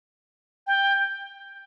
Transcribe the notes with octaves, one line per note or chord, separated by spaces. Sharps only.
G5